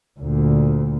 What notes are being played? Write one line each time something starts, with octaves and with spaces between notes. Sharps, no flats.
D2 A#2